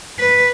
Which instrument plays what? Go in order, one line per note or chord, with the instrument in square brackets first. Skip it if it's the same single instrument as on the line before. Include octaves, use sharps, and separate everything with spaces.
[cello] B4